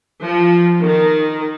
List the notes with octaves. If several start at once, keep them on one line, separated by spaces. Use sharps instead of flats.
F3
D#3